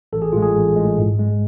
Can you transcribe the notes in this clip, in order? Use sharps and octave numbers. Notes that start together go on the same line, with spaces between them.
A1 A4
G#4
A2 G#3 F4
G#4
A1
A2 G#3
G#2
G#3